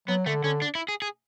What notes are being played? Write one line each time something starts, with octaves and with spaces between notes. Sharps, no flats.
F#3 B3
D3 A3
D3 C#4
D4
E4
G#4
G#4